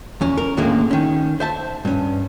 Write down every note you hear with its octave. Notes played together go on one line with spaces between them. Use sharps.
E2 C#4
A#4
D#2 A2 D3 G#3 A#3 C#4
D#3 C#4
C5 E5 A5
G2 C#4